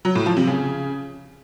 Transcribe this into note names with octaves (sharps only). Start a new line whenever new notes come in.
F#3
A2
F3
C3
C#3